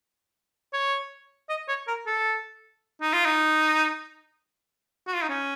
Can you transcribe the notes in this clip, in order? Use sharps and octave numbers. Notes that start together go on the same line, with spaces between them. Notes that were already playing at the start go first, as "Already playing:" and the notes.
C#5
D#5
C#5
A#4
A4
D#4
F4
D#4
F#4
F4
D#4
C#4